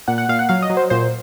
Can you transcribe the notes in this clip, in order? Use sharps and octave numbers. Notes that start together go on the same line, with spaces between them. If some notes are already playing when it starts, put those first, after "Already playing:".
A#2 F#5
F#5
A#2 F5
F#5
F#3 F5
D#5
F#3
C5
A#2 C5